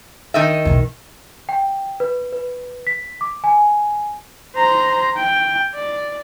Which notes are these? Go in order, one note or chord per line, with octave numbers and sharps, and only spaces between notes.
D#3 D#5 E5
B1 E2
G5
B4
B4
B6
D6
G#5
C5 A#5
G5
D5